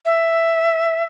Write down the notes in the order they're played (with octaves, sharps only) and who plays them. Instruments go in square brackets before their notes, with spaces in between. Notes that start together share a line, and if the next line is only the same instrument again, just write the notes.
[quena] E5